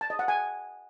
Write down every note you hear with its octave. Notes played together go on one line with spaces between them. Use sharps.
A5
D#5
F#5
G#5